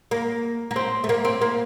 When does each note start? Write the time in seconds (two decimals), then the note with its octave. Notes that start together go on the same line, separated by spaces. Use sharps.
0.11 A#3
0.71 A#3
0.76 C4
1.04 A3
1.09 A#3
1.25 C4
1.41 A#3